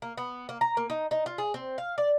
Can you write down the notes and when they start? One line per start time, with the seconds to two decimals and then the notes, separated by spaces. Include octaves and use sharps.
0.02 A#3
0.18 B3
0.49 A#3
0.61 A#5
0.77 A#3
0.90 D#4
1.11 D#4
1.26 F4
1.38 G#4
1.54 C4
1.78 F5
1.98 D5